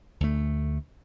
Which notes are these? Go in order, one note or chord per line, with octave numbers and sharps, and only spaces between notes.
D2 A3